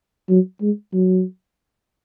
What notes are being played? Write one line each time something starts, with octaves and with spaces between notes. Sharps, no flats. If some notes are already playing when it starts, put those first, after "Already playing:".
F#3
G#3
F#3